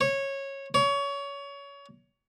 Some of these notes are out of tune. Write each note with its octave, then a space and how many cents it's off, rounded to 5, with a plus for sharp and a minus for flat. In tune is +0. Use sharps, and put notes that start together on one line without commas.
C#5 -15
C#5 +25